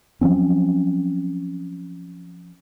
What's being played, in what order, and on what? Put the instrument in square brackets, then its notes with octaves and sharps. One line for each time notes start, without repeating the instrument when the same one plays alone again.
[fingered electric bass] F3 F#3 C4 C#4